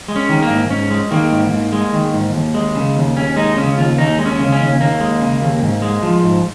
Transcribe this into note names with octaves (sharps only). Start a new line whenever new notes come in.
G#3
C#4
D#3
A#3
G#2
G#2 C#4
G#3
D#3 A#3
G#2
G#2
G#3
D#3
G#2
D#2
G#3
C#3
D#2
D#2 C#4
G#3 D#4
C#3 C#4
D#2 F4
D#2 D#4
G#3
C#4
C#3
C#4
D#2
D#2 A#3
G#3
C#3
D#2
G#2
G#3
F3
G#2